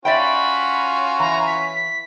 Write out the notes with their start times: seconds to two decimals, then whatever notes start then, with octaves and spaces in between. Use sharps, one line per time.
0.05 C#4 F4 F#4 D5 E5 G5 B5
1.19 E3 A#5
1.47 B6